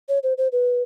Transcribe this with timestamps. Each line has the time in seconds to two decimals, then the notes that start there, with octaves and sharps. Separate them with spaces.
0.09 C#5
0.23 C5
0.38 C5
0.52 B4